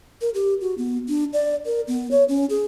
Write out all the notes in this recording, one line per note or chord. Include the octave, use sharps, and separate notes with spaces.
A#4
G4
F#4
B3
D4
D5
A#4
B3
C#5
C#4
G#4